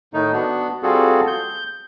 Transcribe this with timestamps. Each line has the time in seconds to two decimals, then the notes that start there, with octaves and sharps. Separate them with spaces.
0.13 A2 D#3 A3 D#4
0.33 B3 D4 F#4
0.83 G3 C4 F4 F#4 G#4 A4
1.27 G6